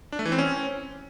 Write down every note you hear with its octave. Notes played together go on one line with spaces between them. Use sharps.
D4
A3
E3
C4
C#4